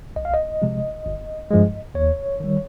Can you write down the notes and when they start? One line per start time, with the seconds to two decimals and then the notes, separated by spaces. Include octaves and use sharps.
0.16 C2 D#5
0.25 F5
0.34 D#5
0.62 C3 F3 G#3
1.06 G1
1.51 G2 F3 G#3
1.95 D#2 C#5
2.40 D#3 G3